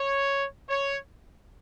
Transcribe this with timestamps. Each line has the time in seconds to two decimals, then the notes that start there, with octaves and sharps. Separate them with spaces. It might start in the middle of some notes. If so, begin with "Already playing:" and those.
Already playing: C#5
0.69 C#5